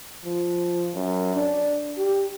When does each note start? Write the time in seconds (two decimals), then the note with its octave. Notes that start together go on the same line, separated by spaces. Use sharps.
0.25 F3
0.95 F#2
1.36 D4
1.97 G4